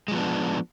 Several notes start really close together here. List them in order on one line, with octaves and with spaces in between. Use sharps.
G#3 F3 B3 D4